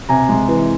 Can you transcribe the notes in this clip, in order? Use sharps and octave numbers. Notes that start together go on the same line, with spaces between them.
C3 G#5 A#5
G#3
E3